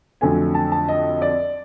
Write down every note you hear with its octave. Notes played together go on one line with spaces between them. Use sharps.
F2 D3 F#3 A3 G#5
A5
A5
D#5
D5